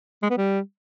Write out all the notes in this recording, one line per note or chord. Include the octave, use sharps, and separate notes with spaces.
G#3
B3
G3